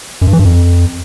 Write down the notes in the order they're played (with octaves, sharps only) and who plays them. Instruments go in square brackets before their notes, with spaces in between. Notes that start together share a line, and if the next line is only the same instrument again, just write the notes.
[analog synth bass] F#2
G2
E3
G2
F2